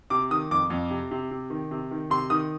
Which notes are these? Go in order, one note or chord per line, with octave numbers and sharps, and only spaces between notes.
C3 D6
D#3 D#6
F2 D6
F2
C3
C3
C3
D#3
C3
D#3
C3 C6
D#3 D#6